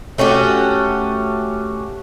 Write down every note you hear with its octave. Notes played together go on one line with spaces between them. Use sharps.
A3 C#4 F#4 G4